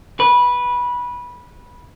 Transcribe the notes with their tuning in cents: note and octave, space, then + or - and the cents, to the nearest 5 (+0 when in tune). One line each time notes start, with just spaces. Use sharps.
B4 -15